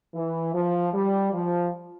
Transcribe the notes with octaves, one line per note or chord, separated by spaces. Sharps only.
E3
F3
G3
F3